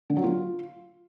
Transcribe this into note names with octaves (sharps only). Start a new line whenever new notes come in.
D3
F#3
F4